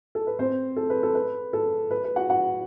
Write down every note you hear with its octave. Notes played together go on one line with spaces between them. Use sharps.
A4
B4
C4 C5
A4
B4
A4
B4
A4
B4
B4
F#4 F#5
F#4 F#5